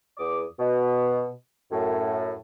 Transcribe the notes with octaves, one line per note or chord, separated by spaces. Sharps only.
E2 D6 D#6
B2
F#2 A2